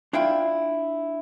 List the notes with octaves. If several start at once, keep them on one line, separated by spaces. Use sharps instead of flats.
D4 E4 F4 G5